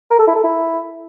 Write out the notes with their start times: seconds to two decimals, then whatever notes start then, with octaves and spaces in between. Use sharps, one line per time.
0.11 A#4
0.19 A4
0.27 E4
0.35 A4
0.44 E4